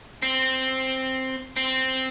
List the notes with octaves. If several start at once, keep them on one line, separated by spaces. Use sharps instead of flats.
C4
C4